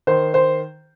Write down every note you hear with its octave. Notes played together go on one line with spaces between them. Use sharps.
D#3 C5
C5